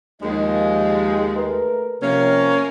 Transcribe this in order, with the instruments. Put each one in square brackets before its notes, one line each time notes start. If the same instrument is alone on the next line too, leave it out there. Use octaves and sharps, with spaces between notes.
[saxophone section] D#2 G#3 [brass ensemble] F3 D#5
[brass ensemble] A3 A#4 B4
[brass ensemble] C3 F3 [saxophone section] A#3 C#4